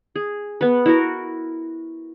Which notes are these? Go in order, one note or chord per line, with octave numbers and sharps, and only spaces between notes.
G#4
B3 B4
E4 F#4 A#4